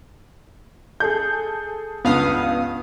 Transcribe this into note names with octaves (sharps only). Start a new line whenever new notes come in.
G#4 A4 G6
C#2 G2 B3 F5 D#6